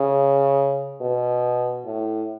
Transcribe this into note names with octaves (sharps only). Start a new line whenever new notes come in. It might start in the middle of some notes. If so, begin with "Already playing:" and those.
Already playing: C#3
B2
A2